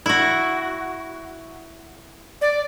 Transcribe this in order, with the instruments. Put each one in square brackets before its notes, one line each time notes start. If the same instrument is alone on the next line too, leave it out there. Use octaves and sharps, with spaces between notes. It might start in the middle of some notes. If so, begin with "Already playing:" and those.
[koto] E4 F#4
[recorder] D5